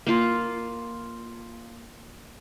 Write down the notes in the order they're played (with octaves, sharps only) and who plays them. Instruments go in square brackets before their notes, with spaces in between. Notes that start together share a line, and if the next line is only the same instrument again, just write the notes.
[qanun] A#3 F4